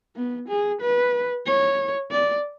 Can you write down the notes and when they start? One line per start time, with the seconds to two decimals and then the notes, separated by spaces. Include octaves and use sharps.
0.16 B3
0.48 G#4
0.81 B4
1.46 C#5
2.11 D5